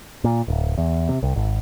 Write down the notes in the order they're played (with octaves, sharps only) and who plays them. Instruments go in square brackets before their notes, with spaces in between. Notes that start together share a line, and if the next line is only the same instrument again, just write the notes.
[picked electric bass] A#2
D1
E2
C3
C2
G#1